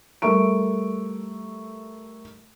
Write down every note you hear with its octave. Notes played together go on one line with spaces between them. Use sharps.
G3 A3 A#4 E5 C#6 D7